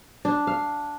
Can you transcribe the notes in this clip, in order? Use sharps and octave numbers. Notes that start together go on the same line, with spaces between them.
D4
F5